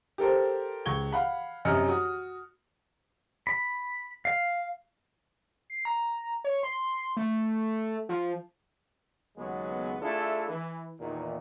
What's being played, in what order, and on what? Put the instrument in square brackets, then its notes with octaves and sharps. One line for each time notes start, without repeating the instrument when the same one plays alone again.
[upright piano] G4 A4 A#4 C5
C#2 C#6 G#6 G7
F5 F#5 B5
F#2 C3 D#5 F6 C#7
F#4 D#6
[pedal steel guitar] B5
F5
[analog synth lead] C7
A#5
C#5
C6
A3
F3
[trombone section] D#2 C#3 F#3 G#3 B3
A3 D4 E4 F4 G#4 A4
E3
E2 A#2 D#3